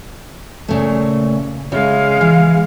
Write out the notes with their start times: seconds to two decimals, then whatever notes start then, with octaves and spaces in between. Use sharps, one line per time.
0.68 A#2 C#3 A3
1.72 C#3 G#3 E5 F5
2.21 E3